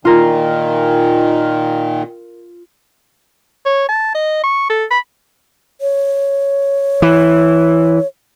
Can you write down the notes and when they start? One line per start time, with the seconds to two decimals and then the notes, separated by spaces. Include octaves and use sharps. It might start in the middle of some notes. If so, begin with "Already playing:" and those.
0.05 A#2 D#3 F4 A#4
3.66 C#5
3.89 A5
4.15 D#5
4.43 C#6
4.70 A4
4.91 B5
5.81 C#5
7.02 E3